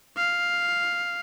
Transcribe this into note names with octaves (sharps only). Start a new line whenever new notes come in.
F5